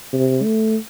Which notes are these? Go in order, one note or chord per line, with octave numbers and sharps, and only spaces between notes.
C3
A3